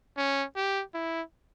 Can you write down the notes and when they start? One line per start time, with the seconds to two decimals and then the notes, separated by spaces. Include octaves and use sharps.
0.17 C#4
0.56 G4
0.94 E4